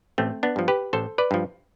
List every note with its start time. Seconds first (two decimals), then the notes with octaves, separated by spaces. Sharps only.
0.18 A1 A3 C4
0.43 B3 D4
0.56 G2 F3
0.68 G4 B4
0.93 A1 A4 C5
1.18 B4 D5
1.31 G2 F3